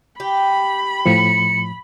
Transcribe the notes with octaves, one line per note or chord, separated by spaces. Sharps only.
G4 B5
A2 F3 C#7